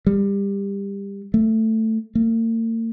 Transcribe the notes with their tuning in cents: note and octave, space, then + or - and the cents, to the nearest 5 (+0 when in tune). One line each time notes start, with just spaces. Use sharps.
G3 +25
A3 +10
A#3 -45